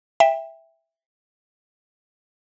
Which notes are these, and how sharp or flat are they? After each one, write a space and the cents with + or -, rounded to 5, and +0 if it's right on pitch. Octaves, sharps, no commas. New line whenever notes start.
E5 +0 G5 +25